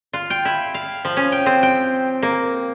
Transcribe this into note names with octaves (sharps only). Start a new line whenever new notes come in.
F4
G5
E4
F5
F3
C#4
G5
C4
G5
A#3